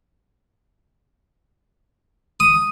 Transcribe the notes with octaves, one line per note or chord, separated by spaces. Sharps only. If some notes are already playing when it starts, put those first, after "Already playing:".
D#6